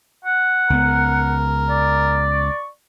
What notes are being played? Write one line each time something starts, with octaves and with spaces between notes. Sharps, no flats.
F#5
C#2 B3 A#4
D5
C#6